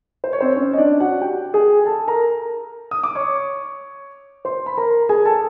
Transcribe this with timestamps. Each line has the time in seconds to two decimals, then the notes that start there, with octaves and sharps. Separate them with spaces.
0.24 C5
0.33 C#5
0.41 C4 C5
0.56 C#4 C#5
0.73 D#5
0.78 D4 D5
1.00 F#4 F#5
1.21 G4 G5
1.54 G#4 G#5
1.86 A4 A5
2.08 A#4 A#5
2.91 D#6
3.03 D6
3.15 C#5 C#6
4.45 C5 C6
4.66 B5
4.77 A#4 A#5
5.09 G#4 G#5
5.25 A4 A5